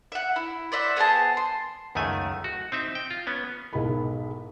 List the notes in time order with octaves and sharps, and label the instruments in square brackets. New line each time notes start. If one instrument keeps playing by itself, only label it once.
[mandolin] E5 F#5
E4
C5 D5 E5 F#5
B3 G#4 C5 A5
C6
[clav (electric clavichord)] C#2 F#2 D#3 A3 G#5
F#4
C4 D#4 E5
G5
F4
B3 C#4
[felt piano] B1 G#2 E4 A#4 B5